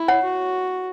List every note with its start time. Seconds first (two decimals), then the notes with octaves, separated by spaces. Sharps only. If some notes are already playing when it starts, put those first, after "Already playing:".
Already playing: E4
0.08 C#5 F#5
0.23 F#4